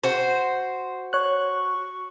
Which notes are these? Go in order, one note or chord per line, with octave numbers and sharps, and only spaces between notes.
F#4 C5
C#5 C#6 F#6